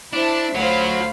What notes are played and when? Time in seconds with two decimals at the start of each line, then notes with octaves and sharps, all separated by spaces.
0.13 D4 E4 C5 E5 A5
0.55 D2 F4 F#4 C5 C#5 F5 B5